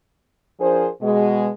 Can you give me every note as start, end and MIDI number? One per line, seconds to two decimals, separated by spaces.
0.60 0.87 53
0.60 0.87 62
0.60 0.87 68
0.60 0.87 70
0.60 0.87 72
1.01 1.48 47
1.01 1.48 56